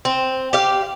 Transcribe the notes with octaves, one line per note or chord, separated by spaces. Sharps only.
C4
G4 F5